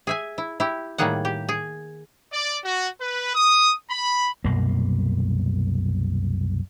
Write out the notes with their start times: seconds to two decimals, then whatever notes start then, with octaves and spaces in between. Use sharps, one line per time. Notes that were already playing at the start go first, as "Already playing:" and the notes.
0.07 G#4 E5 G#5
0.38 E4
0.60 E4 G4
0.98 A2 D#3 G3 A#3 G#4 F#5
1.25 G4
1.49 G#4
2.32 D5
2.64 F#4
3.01 B4
3.35 D#6
3.90 B5
4.44 C2 F#2 B2 A#3